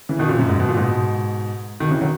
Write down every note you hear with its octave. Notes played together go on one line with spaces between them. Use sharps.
C#3 E3
B2 D#3
A#2 C#3
F#2
G#2
B2
A#2
G#2 B2
B2 D#3
C#3 E3
D#3 F#3